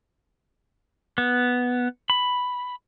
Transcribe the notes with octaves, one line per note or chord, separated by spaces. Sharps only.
B3
B5